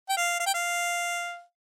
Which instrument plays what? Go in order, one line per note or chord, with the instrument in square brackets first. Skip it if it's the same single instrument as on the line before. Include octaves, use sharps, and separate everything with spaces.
[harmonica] G5
F5
F5
G5
F5